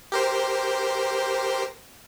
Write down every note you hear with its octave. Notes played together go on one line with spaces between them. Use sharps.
G4 A#4 C5